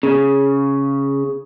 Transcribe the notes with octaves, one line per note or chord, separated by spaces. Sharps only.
C#3